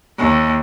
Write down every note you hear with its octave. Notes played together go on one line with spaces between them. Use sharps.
D#2